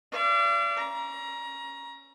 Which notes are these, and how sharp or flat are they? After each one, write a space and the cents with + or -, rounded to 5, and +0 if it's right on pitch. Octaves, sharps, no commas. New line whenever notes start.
D5 -20 F5 -45
C#4 +0 A#5 +25